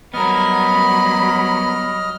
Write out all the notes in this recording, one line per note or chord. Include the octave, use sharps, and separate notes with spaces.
F#3 G3 B3 A#4 D#5 B5 F6